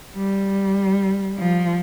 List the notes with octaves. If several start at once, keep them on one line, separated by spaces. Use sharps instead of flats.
G3
F3